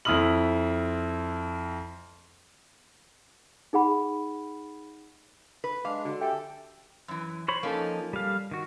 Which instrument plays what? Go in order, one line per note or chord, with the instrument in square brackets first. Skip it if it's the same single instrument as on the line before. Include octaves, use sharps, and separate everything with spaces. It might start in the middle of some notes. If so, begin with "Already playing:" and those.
[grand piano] F2 E4 B5 D#6 F6 F#7
[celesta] D#4 G#4 F#5 B5
[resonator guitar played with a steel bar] B4
[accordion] G#3 D4 [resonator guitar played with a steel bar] F5 [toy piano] D6
[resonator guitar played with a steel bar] D3 [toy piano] F#4
[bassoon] G4 [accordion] A4 [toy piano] E5 G#5
[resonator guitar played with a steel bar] F#2 E3
[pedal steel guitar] C5 C#5 B5
[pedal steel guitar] F3 D#4 [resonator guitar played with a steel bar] A#3 C#4 A4
[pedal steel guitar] G3 F5
D#3 F#4